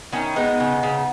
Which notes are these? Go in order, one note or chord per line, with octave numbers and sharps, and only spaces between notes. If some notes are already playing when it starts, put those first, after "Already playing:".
D#3 C#4 E4
G#3 B3 D#4
C#3
C#3